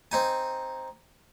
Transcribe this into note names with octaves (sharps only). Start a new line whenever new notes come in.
C4 D#4 G#5